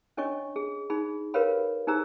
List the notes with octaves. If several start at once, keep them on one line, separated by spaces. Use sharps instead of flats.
C#4 D4 C#5 D#5 C#6
G#4
D#4 G#4 B5
G4 A#4 B4 C#5 F5 B5
D#4 G4 G#4 C5 A#5 E6